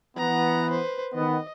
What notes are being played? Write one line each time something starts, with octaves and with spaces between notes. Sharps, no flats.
E3 B3 F#5 A#5
B4 C5
D#3 B3 D#5